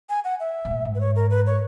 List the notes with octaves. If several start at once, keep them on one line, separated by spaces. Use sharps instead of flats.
G#5
F#5
E5
G#2
A#2
G#2
B4
C#5
A#4
B4
C#5